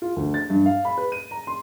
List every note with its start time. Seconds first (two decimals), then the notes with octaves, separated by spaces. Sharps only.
0.02 F4
0.16 D2
0.34 A6
0.50 G2
0.66 F5
0.85 B5
0.98 B4
1.12 D#7
1.31 A#5
1.47 C6